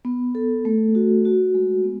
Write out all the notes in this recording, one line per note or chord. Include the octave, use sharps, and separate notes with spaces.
B3
A4
A3
F#4
F#4
G#3
B3